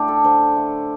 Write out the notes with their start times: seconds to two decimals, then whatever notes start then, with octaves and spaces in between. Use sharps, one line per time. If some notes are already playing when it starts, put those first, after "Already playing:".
Already playing: A2 A3 D4 G4
0.08 A4
0.24 D3 C5
0.56 A3